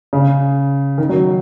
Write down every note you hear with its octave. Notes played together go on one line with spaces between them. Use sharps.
C#3
D#3
F#3